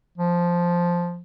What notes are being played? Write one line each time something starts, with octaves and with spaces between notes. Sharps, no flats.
F3